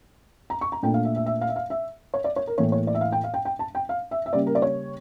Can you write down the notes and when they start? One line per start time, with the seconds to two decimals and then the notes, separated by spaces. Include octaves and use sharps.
0.50 A#5
0.61 C#6
0.72 A#5
0.82 A#2 A3 D4 G5
0.94 F5
1.05 E5
1.16 E5
1.26 E5
1.41 F5
1.49 E5
1.56 F5
1.70 E5
2.14 C#5
2.24 D5
2.36 C#5
2.47 A#4
2.57 A2 E3 A#3 C#5
2.72 C#5
2.87 D5
2.95 E5
3.01 F5
3.12 G5
3.24 F5
3.34 G5
3.45 G5
3.59 A5
3.75 G5
3.89 F5
4.11 E5
4.26 E5
4.33 C#3 G3 A#3 D5
4.47 A#4
4.55 D5
4.62 C#5